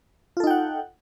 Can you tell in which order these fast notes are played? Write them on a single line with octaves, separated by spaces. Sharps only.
F4 A4 D#4 G5 F#5